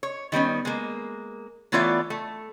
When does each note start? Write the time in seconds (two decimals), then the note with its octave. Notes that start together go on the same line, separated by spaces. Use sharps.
0.03 C#5
0.32 D#3 G3 B3 C#4
0.65 G#3 A#3
1.72 E3 A3 B3 F4 C#5 D5
2.10 A3